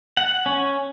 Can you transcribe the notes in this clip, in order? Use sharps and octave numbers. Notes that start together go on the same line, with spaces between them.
F#5
C#4